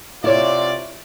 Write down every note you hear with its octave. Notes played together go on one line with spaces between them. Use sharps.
C3 E4 F4 C#5 D5